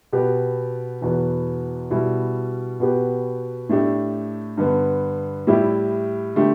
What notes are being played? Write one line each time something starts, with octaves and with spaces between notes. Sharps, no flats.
B2 B3 G4
E2 B2 B3
B2 G3 E4
B2 B3 G4
A2 A3 D4 G4
G2 D3 B3
A2 G3 E4 G4
D3 A3 G4